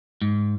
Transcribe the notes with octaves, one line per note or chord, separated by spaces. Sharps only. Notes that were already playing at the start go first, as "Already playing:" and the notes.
G#2